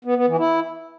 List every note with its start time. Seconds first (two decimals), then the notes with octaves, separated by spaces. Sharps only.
0.05 B3
0.16 B3
0.27 E3
0.38 E4